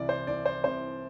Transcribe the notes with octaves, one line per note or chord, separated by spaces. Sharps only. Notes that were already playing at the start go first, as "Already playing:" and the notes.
Already playing: C2 C3 E3 D5
C5
C2 C3 E3 D5
C5
C2 C3 E3 C5